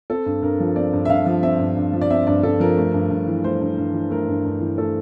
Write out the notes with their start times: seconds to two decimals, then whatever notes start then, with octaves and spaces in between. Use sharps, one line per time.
0.10 C4 A4
0.26 G2
0.43 G2 A#4
0.60 F3
0.76 C4 D5
0.93 G2
1.05 E5
1.09 G2 F5
1.26 F3
1.43 C4 E5
1.59 G2
1.76 G2
1.93 F3
2.02 D5
2.10 C4 E5
2.27 G2 D5
2.43 G2 A4
2.60 F3 A#4
2.78 A3
2.94 G2
3.11 G2
3.27 E3
3.44 A3 C5
3.61 G2
3.78 G2
3.94 E3
4.10 A3 A#4
4.28 G2
4.45 G2
4.61 E3
4.78 A3 A4